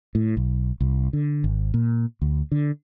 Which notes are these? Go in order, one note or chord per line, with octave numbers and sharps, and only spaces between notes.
A2
B1
C2
D3
G#1
A#2
D2
D3